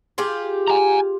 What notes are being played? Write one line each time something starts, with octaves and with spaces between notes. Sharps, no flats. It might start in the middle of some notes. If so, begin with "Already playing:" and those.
F4 G4 G#4
G#5 A#5